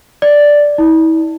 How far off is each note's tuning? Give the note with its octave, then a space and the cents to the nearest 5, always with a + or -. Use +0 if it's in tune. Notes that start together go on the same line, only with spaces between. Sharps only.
D5 +0
E4 -40